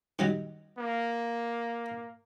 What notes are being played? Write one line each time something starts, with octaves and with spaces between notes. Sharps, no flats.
D#3 F#3 G3
A#3